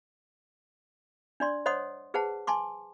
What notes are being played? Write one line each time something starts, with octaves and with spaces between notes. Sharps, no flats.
D4 D5 C6
C5 C#5 D#5 F#5 C6 D#6
G#4 B4 C5 F#5 A5
G#5 A5 C6 D6